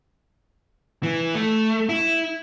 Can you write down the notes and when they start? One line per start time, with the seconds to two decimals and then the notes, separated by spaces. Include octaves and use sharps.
1.03 E3
1.35 A3
1.89 E4